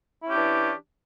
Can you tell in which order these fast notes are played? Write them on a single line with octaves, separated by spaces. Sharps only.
E4 C#4 G4 D4 E3